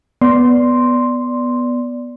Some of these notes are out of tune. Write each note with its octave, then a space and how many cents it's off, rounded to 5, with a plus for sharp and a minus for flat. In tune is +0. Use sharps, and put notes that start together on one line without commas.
B3 +0 D5 -10 C6 +0